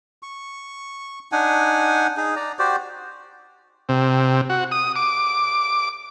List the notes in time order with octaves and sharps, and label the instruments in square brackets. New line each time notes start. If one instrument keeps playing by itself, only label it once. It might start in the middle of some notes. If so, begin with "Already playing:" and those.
[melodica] C#6
D4 D#4 F#5 G#5
D#4 G#4
D5 A#5
F#4 G4 C5 D5
[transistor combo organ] C3
F#4
D#6
D6